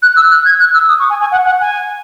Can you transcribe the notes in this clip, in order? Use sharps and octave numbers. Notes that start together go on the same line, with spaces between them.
F#6
E6
F#6
G#6
F#6
E6
D#6
C#6
G#5
G#5
F#5
F#5
G#5